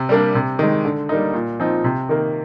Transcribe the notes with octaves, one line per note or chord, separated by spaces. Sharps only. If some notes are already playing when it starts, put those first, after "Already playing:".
Already playing: C3
G3 A#3 D4
C3
D#3 G#3
D3
G3 A#3 D#4
A#2
F3 C4 D#4
C3
D#3 A#3